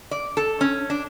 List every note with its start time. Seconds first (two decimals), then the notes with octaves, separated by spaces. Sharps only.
0.11 D5
0.37 A4
0.61 C#4
0.90 D4